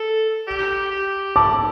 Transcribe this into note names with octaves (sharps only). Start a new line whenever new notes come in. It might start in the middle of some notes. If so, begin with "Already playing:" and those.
Already playing: A4
G4
G4
E4 A5 D6